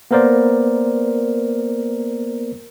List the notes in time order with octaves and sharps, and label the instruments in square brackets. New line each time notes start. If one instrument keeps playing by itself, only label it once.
[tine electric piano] A#3 B3 A#4 C5 D5